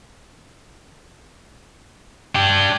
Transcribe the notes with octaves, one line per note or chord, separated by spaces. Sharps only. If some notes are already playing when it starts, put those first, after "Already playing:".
D4 G4 G5